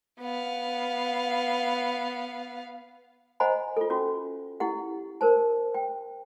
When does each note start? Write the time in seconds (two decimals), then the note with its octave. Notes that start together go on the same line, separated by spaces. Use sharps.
0.21 B3 F5
3.40 C5 D#5 F#5 G#5 A#5 B5
3.77 F4 A4
3.90 C#4 F4 F#4
4.60 E4 G4 F#5
5.21 A#4 C5 A5
5.74 G5